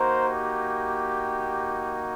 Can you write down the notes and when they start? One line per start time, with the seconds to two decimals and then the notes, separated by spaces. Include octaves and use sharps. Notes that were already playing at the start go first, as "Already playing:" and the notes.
Already playing: A#3 D#4 F#4 A#4 C5
0.28 G4